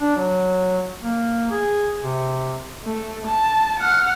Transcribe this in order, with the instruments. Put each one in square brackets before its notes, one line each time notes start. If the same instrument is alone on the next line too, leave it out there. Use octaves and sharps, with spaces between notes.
[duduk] D4
F#3
A#3
G#4
C3
[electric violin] A3
A5
F#5 F6